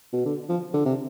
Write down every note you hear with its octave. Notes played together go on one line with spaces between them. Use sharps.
B2
D3
F3
D3
C3